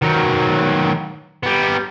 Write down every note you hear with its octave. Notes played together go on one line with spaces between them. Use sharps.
D#3 F#3
G3 B3